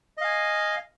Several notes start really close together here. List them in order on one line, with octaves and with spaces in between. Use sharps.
D#5 F5 G#5